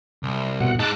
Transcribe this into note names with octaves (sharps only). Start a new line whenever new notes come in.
C2
B2 F#5
G#3 D#4 A5 D6 F#6